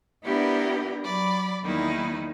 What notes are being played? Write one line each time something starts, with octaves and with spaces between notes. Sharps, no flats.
B3 D4 E4 G4 A#4 B4
F#3 D5 B5
E2 D#3 G3 A#3 D#4 E4